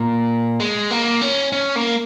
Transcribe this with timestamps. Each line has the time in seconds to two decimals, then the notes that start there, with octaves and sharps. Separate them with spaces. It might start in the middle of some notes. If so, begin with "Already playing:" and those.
Already playing: A#2
0.60 G#3
0.91 A#3
1.21 C#4
1.52 C#4
1.76 A#3